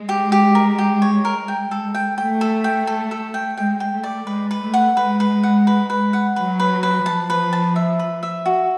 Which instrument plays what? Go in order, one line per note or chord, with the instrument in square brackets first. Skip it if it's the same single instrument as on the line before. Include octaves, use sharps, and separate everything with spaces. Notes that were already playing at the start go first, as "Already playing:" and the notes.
Already playing: [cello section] G#3
[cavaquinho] G4
G4
A#4
G4
C#5
A#4
G5
A4
G5
[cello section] A3 [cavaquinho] G5
[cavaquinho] A4
G5
A4
A4
G5
[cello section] G#3 [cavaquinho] G5
[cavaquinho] G5
[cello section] A3
[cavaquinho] D5
[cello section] G#3 [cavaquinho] B4
[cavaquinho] B4
[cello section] A3
[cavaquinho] F#5
[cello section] G#3 [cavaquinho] B4
[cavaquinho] B4
F#5
B4
B4
F#5
[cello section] F#3 [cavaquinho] B4
[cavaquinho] B4
B4
[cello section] F3 [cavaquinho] A5
[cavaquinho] B4
A5
E5
B4
E5
F#4